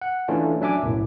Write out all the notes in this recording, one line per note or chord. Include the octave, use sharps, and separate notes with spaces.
F#5
E3 A3 C#4 D4 F4
F#3 D4 E5 G#5 D6
B1 F#2 A2